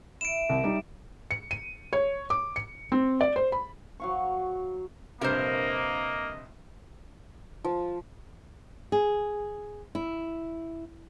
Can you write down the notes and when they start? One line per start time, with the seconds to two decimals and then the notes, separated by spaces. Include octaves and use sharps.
0.21 E4 D7 E7
0.49 C2
0.64 G3 D#4 E5
1.31 C#7
1.51 D#7
1.93 C#5
2.30 D6
2.56 C#7
2.92 C4
3.21 D5
3.36 C5
3.52 B5
4.00 F#3 F5 C#6
5.21 A#1 G2 C3 A#3 A#4 C5 D#5
7.64 F3
8.92 G#4
9.95 E4